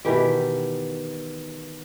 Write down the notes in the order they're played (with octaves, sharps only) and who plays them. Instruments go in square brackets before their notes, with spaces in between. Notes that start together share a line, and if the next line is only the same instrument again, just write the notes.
[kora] B2 D#3 E3 G4